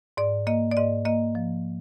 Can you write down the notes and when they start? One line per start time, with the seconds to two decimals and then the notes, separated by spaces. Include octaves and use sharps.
0.17 G#2 D5
0.47 A#3 D#5
0.71 D5
0.77 G#2 D#5
1.05 A#3 D#5
1.35 F3